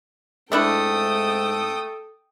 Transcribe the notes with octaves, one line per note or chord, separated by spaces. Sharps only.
G#2 A3 D4 E4 A4 G5 D#6